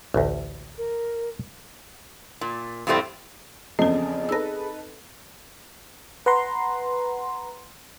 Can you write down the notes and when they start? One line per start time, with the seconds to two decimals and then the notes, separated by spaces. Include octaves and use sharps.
0.14 A1 D2
0.78 A#4
2.41 A#2
2.87 F2 A2 G3 A3 C4
3.79 E2 C#3 F3 C4 G#4 A4 D#5
4.29 D#4 A4 B4 E6 A#6
6.26 B4 F#5 A#5 C6